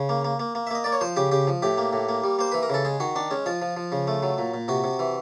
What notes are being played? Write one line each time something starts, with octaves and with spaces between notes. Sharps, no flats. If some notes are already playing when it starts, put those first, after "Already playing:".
Already playing: C#3
A#3
A#3
A#3
A#3
E5
A#3 D#5
A#3 D5
C#5
F3 C5
C#3 G4
C#3 G4
F3
A2 G4
A#3
A2
A#3
G3
A#3 C5
E3 B4
A#4
C#3 A4
G#3 G#4
D#3 F#4
D#3 D4
G#3 C#4
F3 F4
F3
F3
C#3
A3
F#3
A#2
A#2
C3 F#4
C3
E3